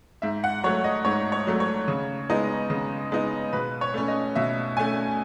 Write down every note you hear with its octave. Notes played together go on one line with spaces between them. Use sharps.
G#2 E5
F#5
F#3 A3 C#5
D#5
G#2 C#5
C#5
F#3 A3
C#5
C#3
G#3 B3 D#4
C#3
G#3 B3 D#4
B2 B4
C#5
A3 C#4
D#5
B2 E5
A3 C#4 G#5